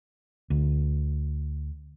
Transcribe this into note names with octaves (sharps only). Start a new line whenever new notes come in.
D2